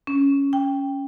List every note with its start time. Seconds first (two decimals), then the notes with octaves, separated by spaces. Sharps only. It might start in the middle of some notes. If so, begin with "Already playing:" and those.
0.07 C#4
0.53 G5